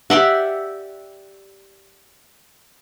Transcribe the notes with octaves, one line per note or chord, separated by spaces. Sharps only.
G4 D5 E5 F#5